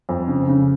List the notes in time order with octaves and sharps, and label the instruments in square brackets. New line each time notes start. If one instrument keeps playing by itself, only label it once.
[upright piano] F2
C#3
C#3